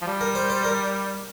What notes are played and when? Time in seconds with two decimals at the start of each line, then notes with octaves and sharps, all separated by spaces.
0.01 F3
0.07 G3
0.21 A#4
0.35 C5
0.50 C5
0.64 A#4